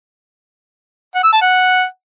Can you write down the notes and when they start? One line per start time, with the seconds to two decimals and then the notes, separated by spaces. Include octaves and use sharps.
1.15 F#5
1.24 E6
1.33 A5
1.41 F#5